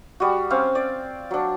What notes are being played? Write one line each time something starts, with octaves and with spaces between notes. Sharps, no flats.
G3 F#4
C4 C#4 F5
D5
F#3 D4